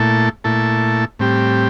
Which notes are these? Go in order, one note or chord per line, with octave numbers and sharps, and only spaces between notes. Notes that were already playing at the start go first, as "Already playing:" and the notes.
Already playing: A#2 A3 E4 A4
A#2 A3 E4 A4
A2 G3 C4 G4